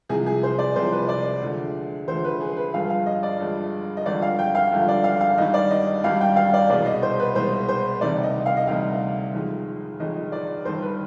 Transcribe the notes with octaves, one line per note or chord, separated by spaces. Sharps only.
C2 C3 F3 G#3 G#4
G#4
C5
D5
C2 C3 F3 G#3 C5
B4
D5
D2 D3 F3 G#3
D2 D3 F3 G#3 C5
B4
G#4
B4
G1 G2 F3 G#3 F5
F5
D#5
D5
G1 G2 F3 G#3
D#5
G#1 G2 D3 F3 D5
F5
G5
F5
G#1 G2 D3 F3
D5
F5
F5
G#1 G2 D#3 G3 D#5
D5
D#5
G#1 G2 D#3 G3 F5
G5
F5
D5
C2 B2 G#3 D5
D#5
C5
B4
C2 B2 G#3 C5
C5
D2 C3 D#3 G3 D5
D#5
F5
D#5
D2 C3 D#3 G3 F5
G1 F2 D#3 G#3
G1 F2 D#3 G#3 D#5
D5
G1 G2 D#3 G3 C5
B4